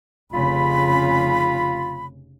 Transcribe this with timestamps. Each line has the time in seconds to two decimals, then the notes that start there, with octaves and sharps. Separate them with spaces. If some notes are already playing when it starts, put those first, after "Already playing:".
0.33 F1 C#3 F4 B5